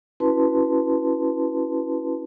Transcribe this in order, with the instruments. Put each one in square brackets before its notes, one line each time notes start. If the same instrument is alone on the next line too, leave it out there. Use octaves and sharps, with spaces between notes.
[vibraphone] C#4 E4 F#4 B4 A5 C6